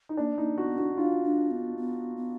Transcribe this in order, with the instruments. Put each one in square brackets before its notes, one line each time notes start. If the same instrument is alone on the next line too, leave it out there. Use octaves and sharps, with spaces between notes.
[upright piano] D#4
[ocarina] A#3 [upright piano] D4
[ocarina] A#3 [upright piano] D#4
[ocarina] B3 [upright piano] F#4
[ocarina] D4 [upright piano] F#4
[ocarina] D4 [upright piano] F4
[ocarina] D4
B3
B3
B3